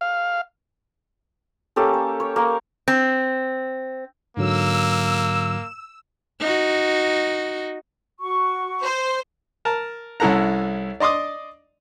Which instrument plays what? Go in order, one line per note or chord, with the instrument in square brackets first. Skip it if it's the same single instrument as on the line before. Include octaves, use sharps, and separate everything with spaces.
[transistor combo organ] F5
[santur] A#3 C#4 G4 A4
C#5
C#5
A#3 A#4
[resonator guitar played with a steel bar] C4
[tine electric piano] G#2 D3 F#3 [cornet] A#3 [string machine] E6
[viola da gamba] D#4 F#4
[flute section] F#4 C#6
[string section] C5
[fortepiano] A#4 A5
C2 C#4 E4 A4 F#5 A#5
D5 D#5 C6 D6 D#6